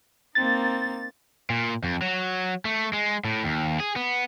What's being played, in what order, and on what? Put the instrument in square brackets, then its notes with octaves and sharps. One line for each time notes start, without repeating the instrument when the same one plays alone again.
[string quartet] A#3 C4 D#4 [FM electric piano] A6
[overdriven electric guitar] A#2
F2
F#3
A3
G#3
A2
D#2
G#4
B3